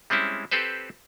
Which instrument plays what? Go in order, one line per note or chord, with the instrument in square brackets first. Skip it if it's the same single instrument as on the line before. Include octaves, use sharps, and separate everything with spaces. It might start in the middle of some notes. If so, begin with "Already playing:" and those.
[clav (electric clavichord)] G3 G#3 C4 C#4 E4
C4 G4 A4 B4 C5